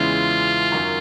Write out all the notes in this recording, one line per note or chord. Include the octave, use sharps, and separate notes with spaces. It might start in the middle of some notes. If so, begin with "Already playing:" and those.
Already playing: E2 C#3 E3 G#3 C#4 F4
F#2 D#3 F#3